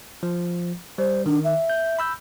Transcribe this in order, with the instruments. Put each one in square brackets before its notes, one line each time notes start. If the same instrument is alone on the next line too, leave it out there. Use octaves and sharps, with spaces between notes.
[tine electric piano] F3
[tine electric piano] G3 [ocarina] C5
[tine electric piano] D#3 [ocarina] D4
[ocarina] E5
[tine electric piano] G6
B5 E6 G6